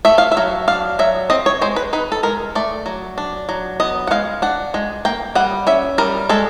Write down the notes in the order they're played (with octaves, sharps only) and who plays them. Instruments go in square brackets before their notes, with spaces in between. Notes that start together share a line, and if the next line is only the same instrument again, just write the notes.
[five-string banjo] A3 E5
F5
E5
F#3
D4 F5
F#3 E5
C4 D#5
C#5
G#3 C5
B4
D#4 B4
A4
G#3 A#4
A3 D5
F#3
D4
F#3
B3 D#5
F#5
G#3 F5
D4 F#5
G#3
A#3 G5
G3 F#5
C#4 E5
G3 A#4
G#3 A4